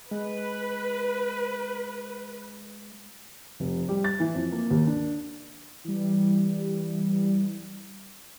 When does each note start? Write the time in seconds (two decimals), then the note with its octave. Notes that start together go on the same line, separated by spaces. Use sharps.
0.11 G#3 B4
3.60 F1
3.88 G3
4.04 A6
4.20 E3
4.35 F2
4.52 A#3
4.71 D#2
4.87 D4
5.85 E3 G3